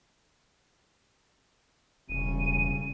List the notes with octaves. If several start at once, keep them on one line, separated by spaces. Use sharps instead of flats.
E1 C#3 G3 D#7